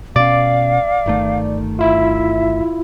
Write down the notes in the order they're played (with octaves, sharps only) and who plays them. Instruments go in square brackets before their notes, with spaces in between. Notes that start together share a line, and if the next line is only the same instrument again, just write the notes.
[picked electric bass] B2 C#4 [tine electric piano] D5 D6 [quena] F5
[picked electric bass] G1 D#3 A3
[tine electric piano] E4 F4 [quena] E5